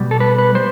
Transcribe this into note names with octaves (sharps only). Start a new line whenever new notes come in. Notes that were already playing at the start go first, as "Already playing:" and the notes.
Already playing: B2 G3
A4
B4
B4
G3 C5